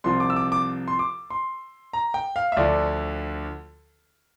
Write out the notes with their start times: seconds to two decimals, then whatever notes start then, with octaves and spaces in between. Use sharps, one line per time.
0.04 C2 C3 F3 C6
0.20 D6
0.30 E6
0.36 D6
0.52 D6
0.88 C6
0.99 D6
1.30 C6
1.93 A#5
2.14 G5
2.36 F5
2.52 E5
2.57 D2 D3 F3 D5